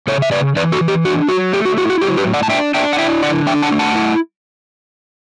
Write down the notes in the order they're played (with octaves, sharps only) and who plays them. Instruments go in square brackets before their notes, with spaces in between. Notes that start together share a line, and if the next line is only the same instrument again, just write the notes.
[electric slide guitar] C#3 A4 C#5
E5
C#3 B4 D5
E3 B4 D5
F#4 A4
E3
G4
D4 F#4
F#3 F#4
A3 G4
F#4
E4 F#4
F#4
F#3 G4
G4 B4
A2
D5 F#5
A5
D4 E5 G5
D4 E5 G5
F#5
E4 E5 G5
D3 D5 F#5
D4 E5 G5
F#5 A5
A3
F#5 A5
E4